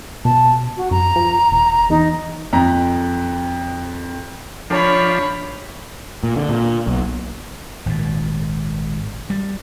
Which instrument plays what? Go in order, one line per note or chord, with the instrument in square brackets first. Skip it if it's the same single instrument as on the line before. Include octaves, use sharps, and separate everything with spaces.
[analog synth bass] B2 [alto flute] A5
[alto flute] F#4
[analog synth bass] F#2 [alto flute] A#5
[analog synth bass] F3
E1
[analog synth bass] E2 [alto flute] D#4
[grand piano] F2 A#5
[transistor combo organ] F3 D4 [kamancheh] C#5 B5
[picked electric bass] A#2
D3
A#2
B1
[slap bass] G#1 A#2
G3